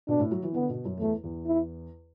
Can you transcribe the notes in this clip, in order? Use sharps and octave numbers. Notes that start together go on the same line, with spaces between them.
B2 D4
A2
F#3
E3
D3 B3
B2
F#2
E2 A3
E2
E4